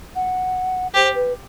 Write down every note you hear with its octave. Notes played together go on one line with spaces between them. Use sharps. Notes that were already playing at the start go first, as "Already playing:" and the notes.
F#5
G4 C5
B4